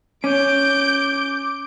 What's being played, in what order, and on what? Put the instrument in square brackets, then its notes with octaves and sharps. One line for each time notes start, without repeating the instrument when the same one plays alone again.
[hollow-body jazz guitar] C#4 [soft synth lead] D6 [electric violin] G6 D7